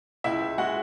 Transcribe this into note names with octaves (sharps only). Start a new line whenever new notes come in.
C#2 E4 E5
C#2
G#3 F#4 F#5